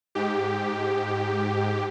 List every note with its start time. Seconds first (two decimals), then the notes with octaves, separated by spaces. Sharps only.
0.15 G#2 G4